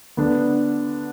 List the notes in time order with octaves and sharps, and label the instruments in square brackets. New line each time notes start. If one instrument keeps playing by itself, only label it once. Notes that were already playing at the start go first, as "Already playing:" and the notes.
[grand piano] D3 B3 D4